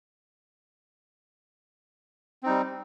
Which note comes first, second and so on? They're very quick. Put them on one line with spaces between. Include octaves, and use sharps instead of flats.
C4 D#4 G3